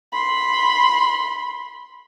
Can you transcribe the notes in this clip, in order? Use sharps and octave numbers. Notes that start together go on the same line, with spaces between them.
B5 C6